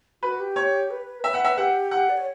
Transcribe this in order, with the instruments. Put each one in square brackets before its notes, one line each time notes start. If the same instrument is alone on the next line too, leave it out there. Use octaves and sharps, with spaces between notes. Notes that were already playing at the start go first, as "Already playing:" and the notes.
[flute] F#4 [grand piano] B4
[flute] G4
[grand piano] C#5
[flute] B4
A#4
[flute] B4 [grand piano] E5
[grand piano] F#5
E5
[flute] G4 [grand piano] F#5
[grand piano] F#5
[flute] D5
C#5